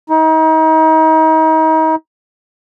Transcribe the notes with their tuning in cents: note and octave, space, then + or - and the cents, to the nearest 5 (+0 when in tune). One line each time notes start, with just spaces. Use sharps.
D#4 +35